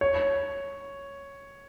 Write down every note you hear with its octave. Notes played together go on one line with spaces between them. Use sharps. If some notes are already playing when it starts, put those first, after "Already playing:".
C#5